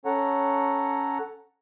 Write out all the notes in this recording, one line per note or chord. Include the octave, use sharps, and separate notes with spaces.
C#4 A4 C#5 F#5 A#5